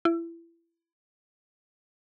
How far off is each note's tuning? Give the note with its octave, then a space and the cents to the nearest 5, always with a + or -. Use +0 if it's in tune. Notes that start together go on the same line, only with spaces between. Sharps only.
E4 +25